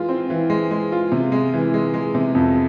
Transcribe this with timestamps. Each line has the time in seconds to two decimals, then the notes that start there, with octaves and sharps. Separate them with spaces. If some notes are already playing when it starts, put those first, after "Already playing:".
Already playing: E3 G#3 F4
0.09 C4
0.30 E3
0.50 G#3
0.71 G#3
0.92 F4
1.12 C3
1.32 G#3
1.54 E3
1.74 G#3
1.94 G#3
2.15 C3
2.35 F2